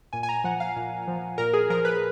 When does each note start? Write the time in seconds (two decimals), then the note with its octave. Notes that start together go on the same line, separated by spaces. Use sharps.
0.13 A#2 G#5
0.23 G#5
0.29 A#5
0.44 F3 F#5
0.60 F5
0.76 A#2
1.08 F3
1.38 A#2 A#4
1.53 G#4
1.70 F3 A#4
1.85 B4